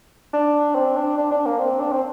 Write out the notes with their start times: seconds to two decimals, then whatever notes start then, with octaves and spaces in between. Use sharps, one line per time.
0.33 D4
0.75 C4
0.97 D4
1.17 D4
1.31 D4
1.46 A#3
1.59 C4
1.81 D4
1.92 C4